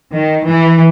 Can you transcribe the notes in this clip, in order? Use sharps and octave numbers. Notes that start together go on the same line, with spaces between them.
D#3
E3